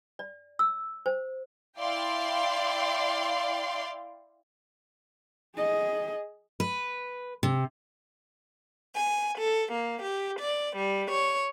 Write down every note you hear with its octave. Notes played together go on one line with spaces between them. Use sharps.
D5
E6
C5
E4 D5 F5 G5 C6
G#4 D#5
B4
C3
G#5
A4
A#3
G4
D5
G3
C#5